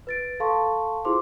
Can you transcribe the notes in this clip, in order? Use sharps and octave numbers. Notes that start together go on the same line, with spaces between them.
B4 A6 D7
A4 F5 A5 C6 C#6
E4 F4 G#4 C5 C6 D6